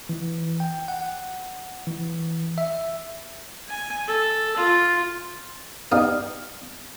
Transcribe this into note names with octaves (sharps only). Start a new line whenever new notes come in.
E3
G5
F#5
E3
E5
G#5
A4
F4
B3 D#4 G4 D5 D#5 F5